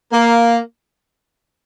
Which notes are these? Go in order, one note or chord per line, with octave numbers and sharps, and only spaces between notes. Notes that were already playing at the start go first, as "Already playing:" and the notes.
A#3